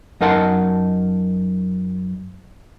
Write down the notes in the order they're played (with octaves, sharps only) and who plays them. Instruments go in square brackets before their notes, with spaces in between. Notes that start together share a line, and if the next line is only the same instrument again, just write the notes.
[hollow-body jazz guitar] F#2 D#4 A#4 F#5 A5 C6